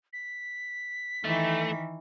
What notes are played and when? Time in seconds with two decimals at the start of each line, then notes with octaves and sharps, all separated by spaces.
0.13 B6
1.24 D#3 E3 A3